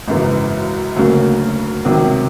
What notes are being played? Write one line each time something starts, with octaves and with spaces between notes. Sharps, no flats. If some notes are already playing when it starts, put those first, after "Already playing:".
G#1 F#2 C#3 E3
D2 C#3 F#3 A#3
C#2 C3 D#3 F#3